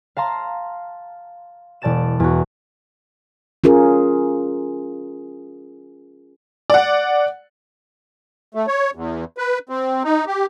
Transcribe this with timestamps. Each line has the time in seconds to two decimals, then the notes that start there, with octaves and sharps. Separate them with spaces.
0.17 F5 A5 A#5 C6
1.82 E1 D5 A5 A6 E7
2.20 E2 F#4
3.64 C#4 F4 G#4 A#4
6.70 D5 F#5
8.55 A3
8.67 C#5
8.95 E2
9.38 B4
9.69 C4
10.04 D#4
10.27 G4